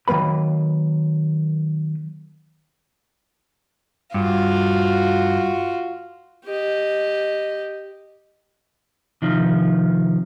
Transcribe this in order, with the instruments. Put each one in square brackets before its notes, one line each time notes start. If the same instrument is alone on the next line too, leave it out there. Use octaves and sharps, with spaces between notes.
[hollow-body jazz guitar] D#3 F#3 A#3 B4 B5
[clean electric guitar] G2 [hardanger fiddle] F4 F#4
[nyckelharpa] G4 D#5
[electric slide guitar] C3 D#3 F3